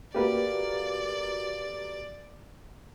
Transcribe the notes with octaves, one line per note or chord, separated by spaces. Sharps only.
A3 A#3 F#4 G4 B4 D5